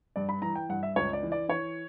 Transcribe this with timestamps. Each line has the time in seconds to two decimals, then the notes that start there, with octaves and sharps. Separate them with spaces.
0.16 G2 D5
0.29 B5
0.42 E3 A#5
0.55 G5
0.69 G2 F#5
0.83 E5
0.96 C#2 C#5
1.13 D5
1.23 E3
1.32 D5
1.49 E3 C#5